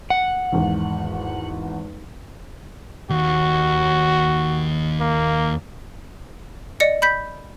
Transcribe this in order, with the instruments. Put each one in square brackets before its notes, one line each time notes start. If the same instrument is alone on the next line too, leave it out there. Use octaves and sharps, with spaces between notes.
[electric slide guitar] F#5
[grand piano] G#1 E2
[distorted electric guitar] D#2 [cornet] F#4
[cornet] A#3
[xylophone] D5 D#5 C#7
B5 G6 B6